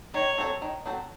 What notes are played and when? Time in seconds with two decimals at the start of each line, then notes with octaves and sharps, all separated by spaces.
0.14 D#3 C#5
0.38 F#3 C4 F#4 A4
0.62 D#3
0.86 F#3 C4 F#4 A4